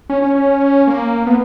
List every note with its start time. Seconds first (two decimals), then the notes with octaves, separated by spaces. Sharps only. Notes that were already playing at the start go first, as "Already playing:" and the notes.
0.10 C#4
0.22 C#4
0.35 C#4
0.87 A#3
1.27 B3